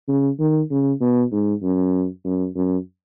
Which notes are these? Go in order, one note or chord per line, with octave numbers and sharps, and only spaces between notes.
C#3
D#3
C#3
B2
G#2
F#2
F#2
F#2